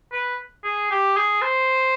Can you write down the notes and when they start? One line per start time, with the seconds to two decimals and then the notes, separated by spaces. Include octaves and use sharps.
0.12 B4
0.64 G#4
0.91 G4
1.17 G#4
1.42 C5